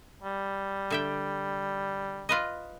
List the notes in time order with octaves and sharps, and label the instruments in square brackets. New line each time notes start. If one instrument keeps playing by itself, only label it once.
[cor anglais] G3
[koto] D3 E5 G5
F4 B4 D#5